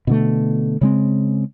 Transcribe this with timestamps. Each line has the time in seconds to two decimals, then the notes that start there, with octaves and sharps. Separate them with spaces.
0.07 B2 D3 A3
0.81 C#3 G#3 C4